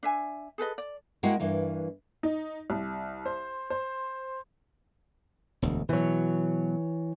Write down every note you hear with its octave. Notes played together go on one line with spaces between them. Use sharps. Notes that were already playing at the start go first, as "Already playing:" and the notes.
D4 E5 G#5
G#4 A4 B4 D#5
D5
G#3 A#3 E4 F#4 F#5 G5
G2 E3 A#3
D#4
C2
C5
C5
E1 D2
B2 E3 F#3 C#5